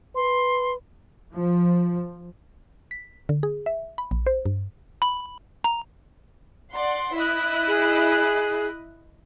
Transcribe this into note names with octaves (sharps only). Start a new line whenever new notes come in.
B4 C6
F3
B6
D3
G#4
E5
B5
A#1
C5
G2
B5
A#5
D5 F#5 C6
E4 D#5 F#6
G#4